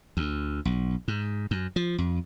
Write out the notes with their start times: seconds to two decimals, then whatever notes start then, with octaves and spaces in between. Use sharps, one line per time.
0.17 D2
0.65 B1
1.08 G#2
1.51 F#2
1.76 F3
1.98 F2